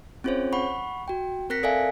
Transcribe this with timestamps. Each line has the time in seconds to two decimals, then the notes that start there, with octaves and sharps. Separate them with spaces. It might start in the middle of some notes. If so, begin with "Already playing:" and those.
0.24 C4 C#4 F4 G#4 C5 C#5
0.52 F#5 B5 C#6
1.08 F#4 G5
1.50 C4 A#4 F#6 A#6 B6 C#7
1.63 A4 D5 E5 F5 G#5